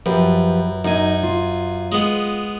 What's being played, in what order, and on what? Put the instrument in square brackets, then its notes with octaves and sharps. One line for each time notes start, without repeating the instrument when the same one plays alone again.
[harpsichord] F#2 [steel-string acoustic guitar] F3 G4 B4
[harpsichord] F#2 G#5 [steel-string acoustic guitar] D#4
[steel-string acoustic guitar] F4
[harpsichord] G#3 B3